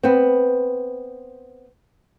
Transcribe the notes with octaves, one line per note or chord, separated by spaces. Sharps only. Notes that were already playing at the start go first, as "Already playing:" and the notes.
B3 C4